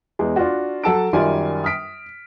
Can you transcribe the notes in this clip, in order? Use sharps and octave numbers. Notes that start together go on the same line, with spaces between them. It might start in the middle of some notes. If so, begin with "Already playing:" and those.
E2 G#3
D4 F4 F#4
F#3 A4 F#5 A5 E6 D7
F#2 D#3 G3 F4 G#5
D#6 F6 B6 D7